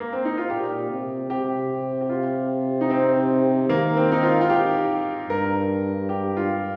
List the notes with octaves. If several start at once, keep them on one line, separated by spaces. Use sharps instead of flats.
A#3
C4
D#4
F4
A#2 G4
C3
C3 G4
G4
F4
D#4
C4
D#3 A#3
C4
D#4
F4
F4
G4
G2 A#4
G4
F4